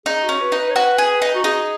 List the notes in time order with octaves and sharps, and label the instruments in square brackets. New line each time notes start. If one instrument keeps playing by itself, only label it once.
[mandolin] D#4 [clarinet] G#4
[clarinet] F#4
[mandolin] C#4
[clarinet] B4
[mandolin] D#4
[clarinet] B4
C#5
[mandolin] F#4 [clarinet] B4
[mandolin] G#4
D#4
[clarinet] F#4
[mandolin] D#4 [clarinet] G#4